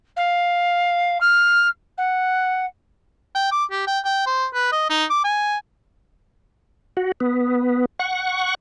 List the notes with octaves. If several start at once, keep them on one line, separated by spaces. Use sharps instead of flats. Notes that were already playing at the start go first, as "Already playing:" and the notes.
F5
F6
F#5
G5
D6
G4
G5
G5
C5
B4
D#5
D#4
D6
G#5
F#4
B3
F#5 C#6